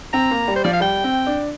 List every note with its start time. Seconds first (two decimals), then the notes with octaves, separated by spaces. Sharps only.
0.13 C4 A#5
0.31 A#3
0.48 G3
0.56 C5
0.64 F3 D5
0.73 F5
0.80 G3 G5
1.04 C4
1.26 D4